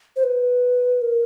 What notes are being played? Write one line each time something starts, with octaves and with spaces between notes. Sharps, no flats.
C5
B4
A#4